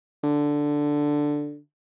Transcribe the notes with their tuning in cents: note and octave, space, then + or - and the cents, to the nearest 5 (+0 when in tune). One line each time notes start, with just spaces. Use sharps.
D3 +0